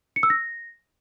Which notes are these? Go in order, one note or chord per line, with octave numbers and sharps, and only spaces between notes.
C#7
E6
A#6